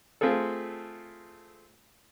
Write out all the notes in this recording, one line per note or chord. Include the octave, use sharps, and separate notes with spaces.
A3 C4 F4 G#4 A4